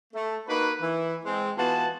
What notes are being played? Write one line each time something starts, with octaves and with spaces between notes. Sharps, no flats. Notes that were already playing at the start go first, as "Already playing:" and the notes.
A3
A#3 D#4 F#4 B4
E3 E4
G#3 C4
E3 B3 F4 F#4 A5